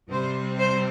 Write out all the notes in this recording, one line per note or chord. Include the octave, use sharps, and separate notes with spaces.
C3 G3 C4 C5
C5